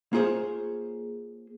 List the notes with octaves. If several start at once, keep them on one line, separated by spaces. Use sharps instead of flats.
A#3 F4 G#4 C5 C#5